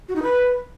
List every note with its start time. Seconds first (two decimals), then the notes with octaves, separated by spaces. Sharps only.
0.08 F#4
0.16 D#4
0.23 B4